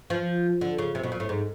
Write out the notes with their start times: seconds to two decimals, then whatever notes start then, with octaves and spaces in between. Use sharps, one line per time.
0.10 F3
0.61 D3
0.78 C#3
0.95 C3
1.03 B2
1.12 A#2
1.20 A2
1.29 G#2